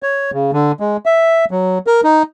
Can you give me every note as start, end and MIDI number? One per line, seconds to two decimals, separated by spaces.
0.03 0.31 73
0.33 0.51 49
0.53 0.72 50
0.80 0.97 56
1.06 1.45 76
1.51 1.78 54
1.87 2.01 70
2.04 2.23 63